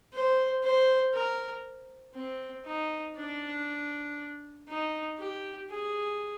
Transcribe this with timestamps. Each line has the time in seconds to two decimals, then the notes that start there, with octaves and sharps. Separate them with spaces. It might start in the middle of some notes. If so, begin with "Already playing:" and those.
0.13 C5
0.63 C5
1.13 A#4
2.15 C4
2.65 D#4
3.16 D4
4.68 D#4
5.18 G4
5.69 G#4